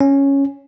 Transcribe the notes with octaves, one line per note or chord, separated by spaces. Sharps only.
C#4